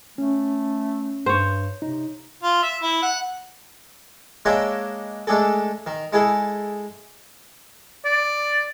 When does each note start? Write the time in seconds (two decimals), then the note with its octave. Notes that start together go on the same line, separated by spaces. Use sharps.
0.18 A3 C#4
1.26 G2 C5 C#5
1.82 C3 D#4
2.43 F4
2.62 E5
2.82 E4
3.02 F#5
4.45 G#3 A#3 D4 C#5 D#5 E5
5.27 G#3 A3 D4 G#4 A4
5.87 D#3
6.13 G#3 E4 G#4 A4
8.05 D5